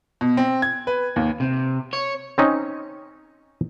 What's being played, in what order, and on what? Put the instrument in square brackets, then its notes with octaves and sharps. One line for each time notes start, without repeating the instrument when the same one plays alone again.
[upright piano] B2
C4
G#6
B4
D#2
[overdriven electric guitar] C3
C#5
[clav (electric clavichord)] C4 C#4 D#4